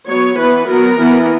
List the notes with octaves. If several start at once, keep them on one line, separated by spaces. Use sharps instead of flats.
F#3 B3 C#5
E3 B3 B4
F#3 B3 A#4
E3 B3